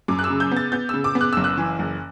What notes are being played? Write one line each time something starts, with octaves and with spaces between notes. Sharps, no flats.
F#2 D6
F#6
E6
C#3
G6
B3
A6
B3 G6
C#3 E6
D6
B3
F#6
F#1 E6
F#6
E3
F#1